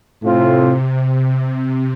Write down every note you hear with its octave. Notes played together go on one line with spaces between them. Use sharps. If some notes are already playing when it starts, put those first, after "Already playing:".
A2 C3 A3 C4 F4
C3